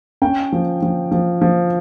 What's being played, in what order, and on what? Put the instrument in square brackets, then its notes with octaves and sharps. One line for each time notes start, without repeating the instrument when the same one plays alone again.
[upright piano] C#4 G5
F3
F3
F3
F3